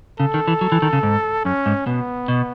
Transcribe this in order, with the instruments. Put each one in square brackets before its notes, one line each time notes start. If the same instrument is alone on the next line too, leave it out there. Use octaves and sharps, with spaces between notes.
[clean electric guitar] C#3 [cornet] A4
[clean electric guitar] D#3
E3
F#3
E3
D#3
C#3
G#2
[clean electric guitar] F#2 [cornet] C#4
[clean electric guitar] G#2
[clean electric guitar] B2 [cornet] B3
[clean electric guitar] B2